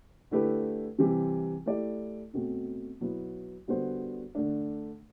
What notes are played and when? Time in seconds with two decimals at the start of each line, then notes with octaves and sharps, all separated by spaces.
0.31 D3 A3 E4 G4 B4
0.99 C3 E3 G3 C4 G4
1.66 A3 E4 G4 D5
2.34 B2 A3 C4 F#4
3.01 B2 F#3 B3 E4
3.68 D3 G3 B3 F#4 C5
4.35 D3 A3 D4